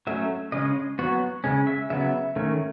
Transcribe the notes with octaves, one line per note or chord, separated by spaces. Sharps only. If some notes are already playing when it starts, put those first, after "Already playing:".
F#3 A3 C#4 E5
C#3 G#3 C#4 D#5
F#3 B3 F#4
C#3 G#3 C#4
E5
C#3 F#3 B3 E5
D#3 A3 C#4